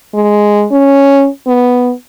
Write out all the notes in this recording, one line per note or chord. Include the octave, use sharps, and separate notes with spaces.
G#3
C#4
B3